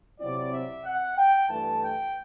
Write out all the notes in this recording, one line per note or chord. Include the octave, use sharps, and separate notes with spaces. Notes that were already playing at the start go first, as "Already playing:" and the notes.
C3 F#3 C4 E4 D5
E5
F#5
G5
G2 E3 A3 A5
G5